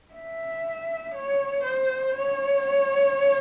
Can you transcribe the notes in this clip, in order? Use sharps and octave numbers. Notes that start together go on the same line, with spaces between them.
E5
C#5
C5
C#5